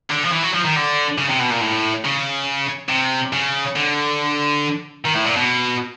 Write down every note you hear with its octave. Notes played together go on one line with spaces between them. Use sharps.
D3
F3
E3
F#3
F3
D#3
D3
C#3
C3
B2
A#2
A2
C#3
C3
C#3
D3
D#3
A2
A#2
B2